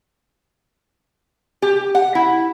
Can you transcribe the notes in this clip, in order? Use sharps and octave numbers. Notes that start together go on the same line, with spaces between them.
G4
F#5
E4